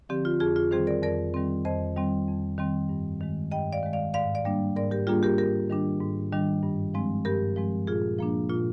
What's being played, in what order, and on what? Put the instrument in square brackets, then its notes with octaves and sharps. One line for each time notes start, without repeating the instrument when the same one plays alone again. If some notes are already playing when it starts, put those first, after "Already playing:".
[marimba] D3 F3 C4 G4
F4
F2 F4 G#4
F4 G#4
D#3 G3 C4 G#4 C5
A#4 D5
F2 A#4 D5
D#3 G3 C4
F2 C5 D#5
D#3 G3 C4
F2
D#3 G3 C4
G2
D#3 G#3
G2 D#5 G5
D5 F5
D#3 G#3
D5 F5
G#2 D5 F5
D5 F5
G3 A#3 D4
G#2 A#4 D5
G4 A#4
G3 A#3 D4 F4 G#4
G4 A#4
G#2 G4 A#4
D#3 G3 D4
G#2
D#3 G3 D4
G2
F3 G#3 C4
G2 G4 A#4
F3 G#3 C4
A#2 F4 G#4
F3 A#3 D4
A#2 F4